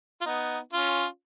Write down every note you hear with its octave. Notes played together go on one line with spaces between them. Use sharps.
F4
B3 D#4
C#4 F4